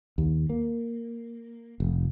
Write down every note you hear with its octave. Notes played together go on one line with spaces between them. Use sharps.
D#2
A#3
F1